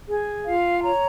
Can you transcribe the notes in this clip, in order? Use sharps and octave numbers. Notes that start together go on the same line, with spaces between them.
G#4
F4 F5
C#5 A#5